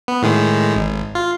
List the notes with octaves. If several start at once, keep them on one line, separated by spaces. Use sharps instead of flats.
B3
A2 D#3 G#3
G#1
F4